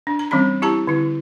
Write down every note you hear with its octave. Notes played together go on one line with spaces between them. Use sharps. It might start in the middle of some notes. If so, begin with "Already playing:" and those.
D4
A#5
E3 G3 C4 C#4 B5
E4 G4 A5 A#5
D3 E4